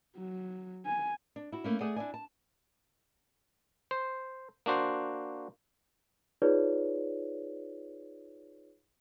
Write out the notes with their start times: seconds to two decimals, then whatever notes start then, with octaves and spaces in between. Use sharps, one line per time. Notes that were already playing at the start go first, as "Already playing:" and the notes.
0.17 F#3
0.86 G#5
1.36 D4
1.52 E4 F#4
1.64 A3 A#3 C#4
1.80 A3 G#4 A4 D5 F#5 G#5
1.96 D4 E4 G#5
2.14 A5
3.91 C5
4.66 A#3 D4 F#4 C5
6.42 D#4 F4 G#4 B4 C#5 D5